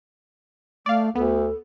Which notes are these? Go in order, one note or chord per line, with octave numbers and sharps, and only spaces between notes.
A3 D5 F5
D2 B3 A4